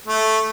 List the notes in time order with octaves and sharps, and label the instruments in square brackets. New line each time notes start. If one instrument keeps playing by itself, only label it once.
[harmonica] A3